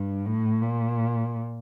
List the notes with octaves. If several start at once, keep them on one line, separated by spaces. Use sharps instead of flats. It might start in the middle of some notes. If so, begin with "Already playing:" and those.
Already playing: G2
A2
A#2